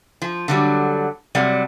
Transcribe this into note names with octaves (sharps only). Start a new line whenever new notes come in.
F3
D3 F#3 G3
C3 F#3 G3 D5 F#5